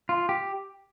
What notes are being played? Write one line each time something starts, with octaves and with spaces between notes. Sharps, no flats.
F4
G4